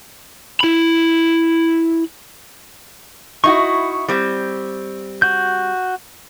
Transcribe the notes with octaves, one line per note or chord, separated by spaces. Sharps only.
E4 B5
D#4 E4 F#4 C#6
G3 C4
F#4 G6